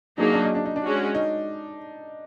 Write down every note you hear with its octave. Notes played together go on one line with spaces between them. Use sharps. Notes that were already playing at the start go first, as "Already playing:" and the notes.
F#3 A#3 D4 D#4 G#4
D4
D#4
D4
D#4
D4
G#3 C#4 F#4
D#4